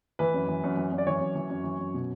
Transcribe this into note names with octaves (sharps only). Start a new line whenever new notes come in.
E3 B4
F#2
E3
F#2
E3
F#2
D5
E3 C#5
F#2
E3
F#2
E3
F#2
B2